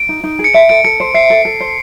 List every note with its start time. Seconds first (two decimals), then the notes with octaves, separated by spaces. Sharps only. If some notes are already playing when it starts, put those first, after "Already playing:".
Already playing: D7
0.09 D#4
0.24 D#4
0.39 G#4
0.44 C#7
0.54 E5 D7
0.69 A4 D7
0.84 A4 C#7
1.00 C5
1.14 E5 C7
1.30 A4
1.45 A4
1.60 C5